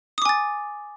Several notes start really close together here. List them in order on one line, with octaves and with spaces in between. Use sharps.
D#6 D6 G#5 A6